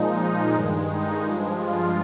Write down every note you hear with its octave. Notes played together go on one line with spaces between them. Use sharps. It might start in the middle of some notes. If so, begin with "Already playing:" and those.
Already playing: A#2 F3 G#3 D#4
D#4
G2 D#3 G#3
D#4
G2 F3 G#3
F4